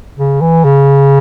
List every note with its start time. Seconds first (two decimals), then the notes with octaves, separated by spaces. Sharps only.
0.18 C#3
0.41 E3
0.65 C#3